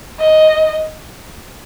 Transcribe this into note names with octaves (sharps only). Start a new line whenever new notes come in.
D#5